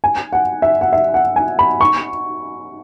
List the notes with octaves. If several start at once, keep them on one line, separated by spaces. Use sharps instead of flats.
G#5
F#5
E5
F#5
E5
F#5
G#5
B5
C#6